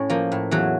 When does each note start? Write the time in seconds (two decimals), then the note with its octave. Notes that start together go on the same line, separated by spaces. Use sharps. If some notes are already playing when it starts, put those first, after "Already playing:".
Already playing: A2 C#4
0.10 F3 A#3
0.32 A2
0.51 E2 F#3